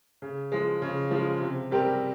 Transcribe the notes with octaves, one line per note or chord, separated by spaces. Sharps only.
C#3
F3 G#3
C#3
F3 G#3
C3
G3 C4 G4 A#4